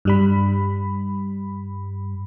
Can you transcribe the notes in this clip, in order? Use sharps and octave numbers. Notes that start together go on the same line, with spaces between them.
G2 G3 B5